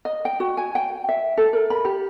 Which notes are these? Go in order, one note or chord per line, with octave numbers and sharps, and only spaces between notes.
D#5
G5
F#4
G#5
G5
E5
A4
A#4
B5
G4